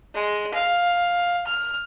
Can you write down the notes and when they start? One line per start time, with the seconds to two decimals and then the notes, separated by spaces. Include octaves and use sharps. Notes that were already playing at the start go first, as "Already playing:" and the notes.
0.15 G#3
0.54 F5
1.47 F6